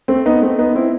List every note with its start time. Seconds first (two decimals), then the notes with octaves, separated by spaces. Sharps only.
0.08 A3 C4
0.26 B3 D#4
0.42 A3 C4
0.59 B3 D#4
0.76 C4 E4